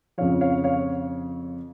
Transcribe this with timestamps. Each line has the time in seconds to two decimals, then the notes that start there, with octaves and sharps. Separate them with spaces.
0.18 F2 C#3 F3 C#5 F5
0.41 C#5 F5
0.64 C#5 F5